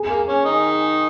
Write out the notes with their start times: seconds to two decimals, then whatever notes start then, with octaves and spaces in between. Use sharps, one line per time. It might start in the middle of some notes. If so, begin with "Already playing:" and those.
Already playing: G#4
0.09 A#3
0.28 C#4
0.45 D#3 D#4